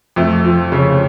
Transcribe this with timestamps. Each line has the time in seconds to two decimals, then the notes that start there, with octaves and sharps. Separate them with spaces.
0.16 F2 A3
0.44 F3
0.72 C#3